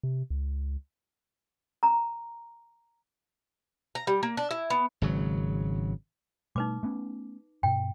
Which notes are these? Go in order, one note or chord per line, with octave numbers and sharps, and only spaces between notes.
C3
C#2
A#5
A#5
G3
A#3
D4
E4
B3
G#1 C#3 F#3
B2 G3 A3 D#4 B4 D6
A3 B3 C#4
G2 B2 G5